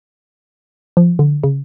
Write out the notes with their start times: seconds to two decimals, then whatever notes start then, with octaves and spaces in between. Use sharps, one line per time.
0.97 F3
1.19 D3
1.43 C#3